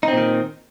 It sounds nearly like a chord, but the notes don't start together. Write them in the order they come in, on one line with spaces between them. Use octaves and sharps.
D#4 C4 A#2 D#3